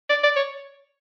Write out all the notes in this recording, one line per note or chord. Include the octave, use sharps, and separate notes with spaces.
D5
D5
C#5